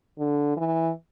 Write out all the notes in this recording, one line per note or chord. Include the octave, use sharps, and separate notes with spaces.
D3
E3